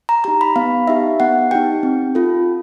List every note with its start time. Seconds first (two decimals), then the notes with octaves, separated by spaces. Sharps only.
0.09 A#5
0.24 D#4 G4 A#5
0.41 B5
0.56 B3 F5
0.87 D#4 G4 E5
1.20 B3 F#5
1.51 D#4 G4 G5
1.83 C4
2.15 F4 A4